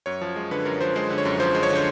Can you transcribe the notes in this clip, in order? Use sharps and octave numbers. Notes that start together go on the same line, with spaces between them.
F#2 C#5
F3
G#3
D3 B4
F#2 A#4
F3 C5
G#3 C5
D3
C#5
F#2
F3 C5
G#3
C#5
D3 C5